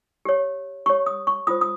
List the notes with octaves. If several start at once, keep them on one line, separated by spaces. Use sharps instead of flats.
G4 C#5
G4 C#5 C#6
D#6
C#6
F4 C5 D#6
D#6